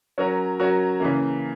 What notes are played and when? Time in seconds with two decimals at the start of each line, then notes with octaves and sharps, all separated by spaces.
0.18 F#3 C#4 F#4 A#4
0.60 F#3 C#4 F#4 A#4
1.00 C#3 E3 A#3